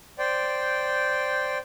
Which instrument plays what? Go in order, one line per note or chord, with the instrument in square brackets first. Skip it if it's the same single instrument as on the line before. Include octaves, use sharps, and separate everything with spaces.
[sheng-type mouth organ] C5 D5 G5